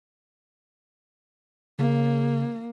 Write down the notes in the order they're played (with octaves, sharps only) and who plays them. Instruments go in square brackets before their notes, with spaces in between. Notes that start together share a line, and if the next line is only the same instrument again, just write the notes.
[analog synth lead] C#3 [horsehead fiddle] A#3